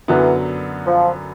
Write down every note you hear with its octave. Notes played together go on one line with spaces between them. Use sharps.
F#2 D3 E3 F#3 B3
F3